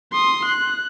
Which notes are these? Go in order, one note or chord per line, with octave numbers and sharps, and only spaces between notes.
C6 D#6
F#6